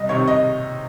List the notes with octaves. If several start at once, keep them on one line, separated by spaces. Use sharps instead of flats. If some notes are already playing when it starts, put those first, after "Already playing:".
Already playing: C2 D#5
C3 D#3 C#5
D#5